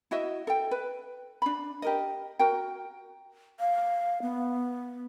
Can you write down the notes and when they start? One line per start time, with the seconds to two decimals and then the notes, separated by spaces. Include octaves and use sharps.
0.11 E4 F#4 D#5 E5
0.47 A4 G5
0.71 B4
1.42 D4 B5
1.82 G4 A#4 D#5
2.39 F#4 A#4 G5
3.60 F5
4.22 B3